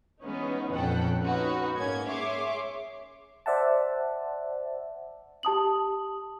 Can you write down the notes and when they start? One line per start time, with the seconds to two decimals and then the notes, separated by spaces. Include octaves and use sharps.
0.22 E3 G#3 B3 C#4 D#4
0.73 A#1 F2 C#4 A4 F#5 G5
1.21 C#4 D#4 F#4 B4
1.74 G#2 A#3 C#4 G#6
2.09 G#4 C#5 E5 C6 D6
3.46 C5 D5 E5 F#5 A5
5.43 G4 A5 D#6 F#7